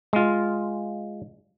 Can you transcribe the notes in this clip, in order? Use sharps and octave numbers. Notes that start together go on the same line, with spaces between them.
G#3 F4